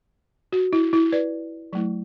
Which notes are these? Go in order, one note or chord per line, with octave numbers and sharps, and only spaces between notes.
F#4
E4
E4
B4 D5
F#3 A3 E4